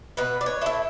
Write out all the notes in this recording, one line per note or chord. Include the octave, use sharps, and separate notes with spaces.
B2 B4
D5
C#5
A3 E4 E5